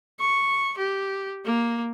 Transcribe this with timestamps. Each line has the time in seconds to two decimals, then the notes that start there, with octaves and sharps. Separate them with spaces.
0.20 C#6
0.78 G4
1.45 A#3